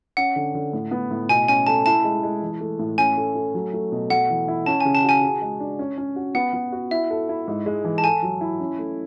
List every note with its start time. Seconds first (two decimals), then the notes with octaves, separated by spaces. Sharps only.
0.17 C#4 F#5
0.36 D3
0.55 D3
0.73 A2
0.91 B3
1.11 A2
1.29 B2 G#5
1.48 C#4 G#5
1.67 A3 A5
1.86 E4 A5
2.04 G#3
2.23 G#3
2.42 E3
2.61 A3
2.79 A2
2.98 C#4 G#5
3.17 A3
3.35 A3
3.54 F#3
3.73 A3
3.92 B2
4.10 A3 F#5
4.30 E3
4.48 E4
4.66 C#4 A5
4.81 C#3 G#5
4.95 A5
5.04 F#4 G#5
5.22 G#4
5.42 G#3
5.60 D4
5.79 C#4
5.98 C#4
6.16 F#4
6.35 B3 F#5
6.53 B3
6.72 F#4
6.91 E4 E5
7.10 A4
7.29 E4
7.48 G#2
7.66 G#3
7.84 E3
7.98 A5
8.04 A4 G#5
8.23 F#3
8.41 E4
8.60 C#4
8.79 A3